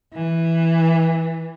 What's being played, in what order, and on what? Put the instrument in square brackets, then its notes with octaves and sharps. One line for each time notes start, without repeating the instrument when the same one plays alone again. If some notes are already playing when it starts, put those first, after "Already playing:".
[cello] E3